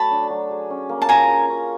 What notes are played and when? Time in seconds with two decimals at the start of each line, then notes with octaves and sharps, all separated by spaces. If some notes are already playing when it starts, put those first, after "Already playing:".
Already playing: F#3 A3 A5 B5
0.11 D4
0.30 F#3
0.51 G#4
0.70 C#4
0.89 A#3
1.02 A5
1.09 F4 G#5 A#5
1.29 G#4
1.49 C#4